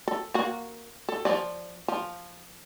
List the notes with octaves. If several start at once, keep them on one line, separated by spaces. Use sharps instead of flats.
A4
A#3 F#4
A4
F3 D5
F3